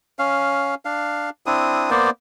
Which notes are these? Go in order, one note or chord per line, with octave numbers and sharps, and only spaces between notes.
C#4 F5
D4 F5
C4 D4 E4 D#6
A#3 B3 C5 D5